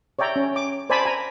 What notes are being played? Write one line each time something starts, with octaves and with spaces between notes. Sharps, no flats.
C#5 D5 E5 G5 A#5
C#4
D6
C5 D5 G#5 A5 B5
G#5 A#5